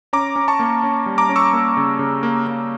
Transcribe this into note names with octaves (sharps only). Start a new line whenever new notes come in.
C#4 A#5 D6
C#4
A5 C#6
A#3
C#4
G3
A#5 D6
C#4
C#6 E6
A#3
C#3
C#3
A#3
A#3